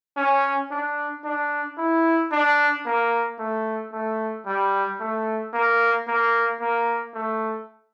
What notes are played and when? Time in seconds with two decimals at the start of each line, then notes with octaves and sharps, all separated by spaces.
0.17 C#4
0.71 D4
1.25 D4
1.78 E4
2.32 D4
2.86 A#3
3.39 A3
3.92 A3
4.47 G3
5.00 A3
5.53 A#3
6.08 A#3
6.61 A#3
7.15 A3